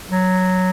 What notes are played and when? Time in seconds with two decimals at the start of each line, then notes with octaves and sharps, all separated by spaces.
0.10 F#3